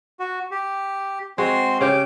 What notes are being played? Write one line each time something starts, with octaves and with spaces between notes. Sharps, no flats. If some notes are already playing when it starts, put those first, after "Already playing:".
F#4
G4
G#3 C4 F#4 C6
C#3 C#4 G4 D6